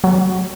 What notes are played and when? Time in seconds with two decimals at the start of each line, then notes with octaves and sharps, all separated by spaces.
0.04 F#3